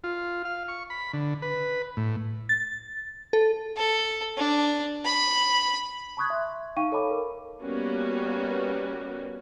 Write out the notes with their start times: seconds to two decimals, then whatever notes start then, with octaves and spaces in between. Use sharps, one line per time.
0.04 F4
0.45 F5
0.68 C#6
0.90 B5
1.13 D3
1.42 B4
1.97 A2
2.49 A6
3.33 A4
3.77 A4
4.37 D4
5.05 B5
6.17 A5 B5 C#6 D#6 F#6 G#6
6.30 E5 C6
6.77 D#4 F5 G5 C#6 D#7
6.92 A4 C#5 D#5 A5 B5 D6
7.11 A#4
7.62 G3 A#3 B3 C#4 F#4